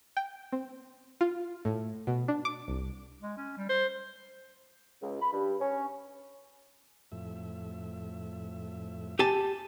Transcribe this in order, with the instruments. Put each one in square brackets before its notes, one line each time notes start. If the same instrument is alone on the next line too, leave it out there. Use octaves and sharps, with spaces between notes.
[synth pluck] G5
C4
F4
A2
B2
D4
D6
C2
[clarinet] G#3
C#4
G3
C5
[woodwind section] C#2
B5
G2
C#4
[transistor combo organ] F2 A2 E5
[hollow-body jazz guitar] G4 G#5 A5